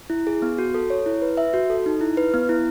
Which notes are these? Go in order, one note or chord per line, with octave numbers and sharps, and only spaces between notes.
E4
G#4
B3
F#4
A4
C#5
E4
B4
E5
F#4
A4
D#4
E4
B4
B3
E4